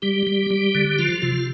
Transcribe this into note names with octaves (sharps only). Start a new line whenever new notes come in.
G3 G4
G3
G3
D3
F3 F4
C3 F4